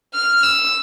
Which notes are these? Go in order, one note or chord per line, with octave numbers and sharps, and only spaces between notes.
F6
E6